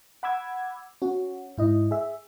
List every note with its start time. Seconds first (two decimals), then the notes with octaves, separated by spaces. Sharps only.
0.23 F#5 B5 D6 E6 G#6
1.02 C#4 F#4
1.57 G#2 E4 D#5
1.91 G#4 E5